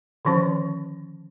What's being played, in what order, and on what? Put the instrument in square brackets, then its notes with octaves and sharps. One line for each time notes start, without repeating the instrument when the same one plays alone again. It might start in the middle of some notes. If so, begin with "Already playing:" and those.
[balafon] D3 D#3 F3 C#4 C5